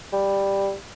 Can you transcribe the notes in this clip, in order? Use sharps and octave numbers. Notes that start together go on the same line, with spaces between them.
G3